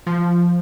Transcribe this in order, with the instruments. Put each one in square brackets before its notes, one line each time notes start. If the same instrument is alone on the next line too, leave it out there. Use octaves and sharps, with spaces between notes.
[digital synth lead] F3